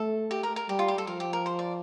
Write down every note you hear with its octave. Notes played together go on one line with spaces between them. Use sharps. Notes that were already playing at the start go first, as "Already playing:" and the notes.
Already playing: A3 A4
G4
A#4
A#4
G3 G4
F4
G4
A4
F3 A#4
G4
A#4
C5
D5